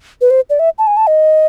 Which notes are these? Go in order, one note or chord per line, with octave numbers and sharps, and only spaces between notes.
B4
C5
D5
E5
A5
G#5
A5
D#5